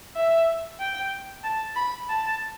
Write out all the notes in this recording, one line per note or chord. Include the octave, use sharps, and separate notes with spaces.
E5
G5
A5
B5
A5